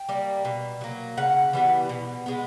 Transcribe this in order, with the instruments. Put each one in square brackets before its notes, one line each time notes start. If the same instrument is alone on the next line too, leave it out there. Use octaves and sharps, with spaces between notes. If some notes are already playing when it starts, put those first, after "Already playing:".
Already playing: [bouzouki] G5
G3 A#3
B2
F#3 A#3
C#3 F#5
E3 G3 B3
B2
G#3 B3